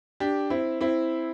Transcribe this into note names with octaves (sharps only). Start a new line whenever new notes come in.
D4 G4
C4 E4
C4 E4